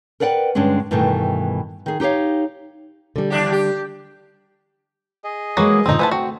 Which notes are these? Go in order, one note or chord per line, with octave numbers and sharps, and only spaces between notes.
A#4 B4 D5 F#5 G5
G2 D3 G#3 C#4 D4
G2 B2 D#3 E3 A3
D#3 G#4
D#4 G4 B4 C#5 F5
D3 G3
D#2 D4 G4
G4
G#4 D#5
G#3 A#3 F#4 A#4 B4 C#5
A#2 D3 A#3 C4 D#4
E3 A3 C5 E5 F#5 G#5 A5
C4 F#4